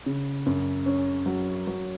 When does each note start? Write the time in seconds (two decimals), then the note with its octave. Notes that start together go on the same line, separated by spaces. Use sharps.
0.06 C#3
0.46 F#2
0.86 C#4
1.26 F#3
1.67 F#3